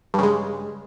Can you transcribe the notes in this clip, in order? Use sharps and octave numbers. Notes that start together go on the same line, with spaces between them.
G2 C#3 G#3